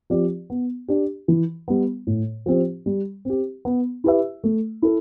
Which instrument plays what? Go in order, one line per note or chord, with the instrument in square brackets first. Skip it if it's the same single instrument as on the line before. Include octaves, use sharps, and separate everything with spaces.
[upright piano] F3 C4 G4 D5
B3
D4 G4
E3
G3 B3
A2
F3 C4 G4
G3
C4 G4
B3
E4 G4 B4 E5
A3
E4 A4